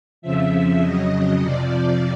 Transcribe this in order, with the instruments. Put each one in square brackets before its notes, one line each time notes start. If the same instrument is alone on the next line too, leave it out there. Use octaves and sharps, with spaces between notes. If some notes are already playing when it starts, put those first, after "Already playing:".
[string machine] F2 C#3 F3 E5
F2 C#3 F#3 D#5
F2 C3 F3 D5